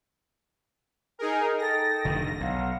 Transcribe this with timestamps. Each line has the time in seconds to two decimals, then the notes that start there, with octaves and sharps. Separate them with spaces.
1.19 D#4 G#4 A#4 G#5
1.58 D#4 A4 G5 A#6
2.05 F1 D3 D#3
2.41 B1 F5 F#5